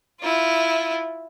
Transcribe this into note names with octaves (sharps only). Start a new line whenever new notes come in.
E4 F4